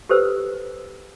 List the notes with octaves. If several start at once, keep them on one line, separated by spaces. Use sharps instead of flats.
G4 A4 B4 C5 E6